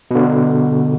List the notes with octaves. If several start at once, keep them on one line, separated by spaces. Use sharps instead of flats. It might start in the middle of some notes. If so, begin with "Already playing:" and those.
B2 D3